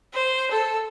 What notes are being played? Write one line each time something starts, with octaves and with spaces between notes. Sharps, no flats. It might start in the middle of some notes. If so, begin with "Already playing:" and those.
C5
A4